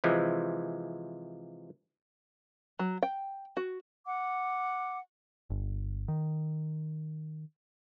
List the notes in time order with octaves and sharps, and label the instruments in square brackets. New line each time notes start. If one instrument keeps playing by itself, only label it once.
[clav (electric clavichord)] C3 E3 F3 G#3
[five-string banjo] F#3
G5
F#4
[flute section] F#5 D6
[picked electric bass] G1
D#3